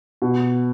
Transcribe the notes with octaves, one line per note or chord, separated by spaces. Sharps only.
B2